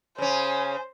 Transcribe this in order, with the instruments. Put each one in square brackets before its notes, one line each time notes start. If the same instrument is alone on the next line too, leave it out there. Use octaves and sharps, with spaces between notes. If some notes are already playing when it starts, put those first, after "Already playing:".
[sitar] C#3 C#4 [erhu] C5 [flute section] G#5